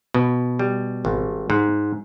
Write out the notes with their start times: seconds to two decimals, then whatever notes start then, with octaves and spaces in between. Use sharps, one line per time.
0.14 B2
0.59 G3
1.05 G#1
1.50 G#2